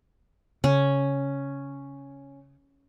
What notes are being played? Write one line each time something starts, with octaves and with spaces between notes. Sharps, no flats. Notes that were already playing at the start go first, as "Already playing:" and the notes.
C#3 C#4